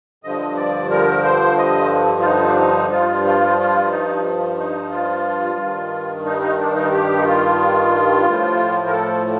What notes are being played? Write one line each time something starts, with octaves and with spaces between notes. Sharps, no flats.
G2 D3 F3 D#5
D5
A#4
C5
D#5
F4
D#4
D4
D#4
G2 F3 F4
F4
F4
D#4
D#4
F4
G2 D#3
D#4
D#4
D4
D#4
G4
D#4
F4
A2 F3
A#4
A4